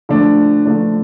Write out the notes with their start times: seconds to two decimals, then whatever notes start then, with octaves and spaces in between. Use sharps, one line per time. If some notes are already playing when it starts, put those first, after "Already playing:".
0.09 D3 F3 A3 D4
0.65 D3 F3 A3 D4